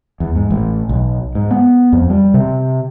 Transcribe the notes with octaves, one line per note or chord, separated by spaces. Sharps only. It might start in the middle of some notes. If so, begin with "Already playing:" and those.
E2
G#2
A1
B1
G#2
B3
F2
G3
C3